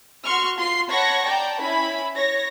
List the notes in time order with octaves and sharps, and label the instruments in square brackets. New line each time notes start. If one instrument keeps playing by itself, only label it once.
[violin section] F#4 C6 C#6 F6
F4 C6 C7
C#5 F#5 A5 B5 C#6 A#6
D5 G5 A5 A#5
C#4 E4 B5
C#5 A#6